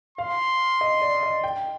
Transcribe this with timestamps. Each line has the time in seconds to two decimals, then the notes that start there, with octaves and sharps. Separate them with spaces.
0.18 F5 C6
0.81 D#5
1.02 D5
1.23 D#5
1.44 G5